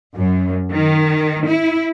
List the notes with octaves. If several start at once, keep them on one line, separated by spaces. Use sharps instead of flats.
F#2
D#3
E4